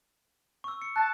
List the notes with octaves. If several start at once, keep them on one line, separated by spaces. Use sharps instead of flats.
C#6 E6
C#7
A5 F#6 A6